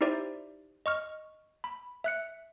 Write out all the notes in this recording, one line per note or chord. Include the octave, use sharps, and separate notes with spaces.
D#4 E4 G4 C5 D5 E5
D#5 C#6 F6
B5
E5 F#6 C#7